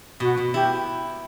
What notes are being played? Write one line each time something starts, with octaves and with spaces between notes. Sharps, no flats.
B2 F#4
B2
E4 G4